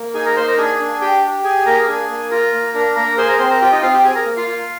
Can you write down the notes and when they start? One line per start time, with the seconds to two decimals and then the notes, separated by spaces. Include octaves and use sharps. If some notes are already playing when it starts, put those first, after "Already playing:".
Already playing: A#3
0.14 D#4 G#4 G#5
0.26 A#4 A#5
0.36 A#3 C5 C6
0.47 A#4 A#5
0.58 D4 G#4 G#5
0.80 D4
1.01 G4 G5
1.23 G4
1.44 G#4 G#5
1.66 A#3 A#4 A#5
1.88 D4 G#4 G#5
2.10 A#3
2.31 F4 A#4 A#5
2.53 A#3
2.74 D4 A#4 A#5
2.96 A#3 A#4 A#5
3.18 G#4 C5 C6
3.28 A#4 A#5
3.39 C4 C5 C6
3.50 A#4 A#5
3.61 F4 G4 G5
3.72 D#4 D#5
3.83 C4 F4 F5
3.93 G4 G5
4.04 G#4 G#5
4.15 A#4 A#5
4.26 A#3
4.37 F4 F5
4.48 F4